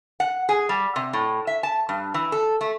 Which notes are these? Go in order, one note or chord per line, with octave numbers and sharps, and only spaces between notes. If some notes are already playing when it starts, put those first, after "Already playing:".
F#5
G#4
G3
C3
A2
E5
A5
G2
E3
A4
A3